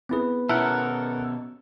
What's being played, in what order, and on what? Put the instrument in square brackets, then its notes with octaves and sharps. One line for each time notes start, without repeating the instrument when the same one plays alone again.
[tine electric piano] B3 B4 [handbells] C4 E4 G#4
[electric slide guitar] B2 C#4 [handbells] E4 E5 [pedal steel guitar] A4 A#4 F#5